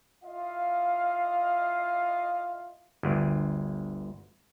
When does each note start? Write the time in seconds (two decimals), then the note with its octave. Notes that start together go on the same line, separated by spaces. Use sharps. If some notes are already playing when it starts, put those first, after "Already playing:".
0.24 E4 F4 D#5 F5
3.03 G1 D2